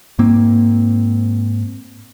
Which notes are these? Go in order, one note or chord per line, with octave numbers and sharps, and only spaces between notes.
G#2 A#3 C4